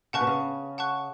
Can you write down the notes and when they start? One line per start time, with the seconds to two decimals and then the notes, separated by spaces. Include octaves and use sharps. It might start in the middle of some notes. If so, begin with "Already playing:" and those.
0.13 C#3 F#5 A5 C#6 F#6
0.21 B2
0.27 C#3
0.78 F#5 A5 C#6 F#6